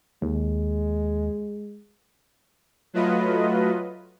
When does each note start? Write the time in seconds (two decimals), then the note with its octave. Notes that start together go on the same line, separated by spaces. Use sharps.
0.22 D#2 G#3
2.93 F#3 A3 F4 B4 D#5